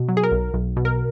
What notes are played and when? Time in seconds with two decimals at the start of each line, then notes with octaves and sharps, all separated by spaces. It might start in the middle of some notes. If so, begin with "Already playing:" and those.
Already playing: B2
0.08 F#3
0.17 G#4
0.23 A#4
0.32 B1
0.54 B1
0.77 B2
0.85 A#4